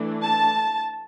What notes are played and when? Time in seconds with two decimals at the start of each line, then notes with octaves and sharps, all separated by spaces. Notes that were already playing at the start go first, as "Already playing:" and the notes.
Already playing: E3 A3 D4
0.23 A5